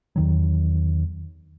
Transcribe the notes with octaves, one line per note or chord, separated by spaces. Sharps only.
E2 D#3 F#3